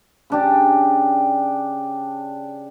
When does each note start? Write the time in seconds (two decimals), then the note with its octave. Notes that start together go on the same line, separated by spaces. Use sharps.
0.30 C#3 D4 G4